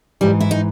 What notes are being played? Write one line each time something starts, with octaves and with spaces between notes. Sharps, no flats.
G#2 E3 G3
E4
D#4